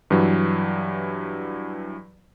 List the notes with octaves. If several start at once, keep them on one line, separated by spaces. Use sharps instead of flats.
G2 E3 F#3